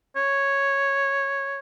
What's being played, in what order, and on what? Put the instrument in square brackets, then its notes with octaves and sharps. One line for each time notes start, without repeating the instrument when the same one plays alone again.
[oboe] C#5